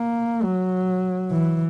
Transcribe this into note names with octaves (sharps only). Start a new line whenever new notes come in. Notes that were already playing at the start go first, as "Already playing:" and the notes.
Already playing: A#3
F#3
E3